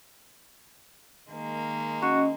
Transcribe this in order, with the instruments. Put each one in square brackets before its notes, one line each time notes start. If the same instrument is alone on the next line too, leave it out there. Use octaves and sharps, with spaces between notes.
[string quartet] D#3 G#3 A#3
[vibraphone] C#4 D#5 [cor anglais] F#4